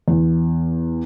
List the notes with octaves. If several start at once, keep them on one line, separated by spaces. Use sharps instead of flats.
E2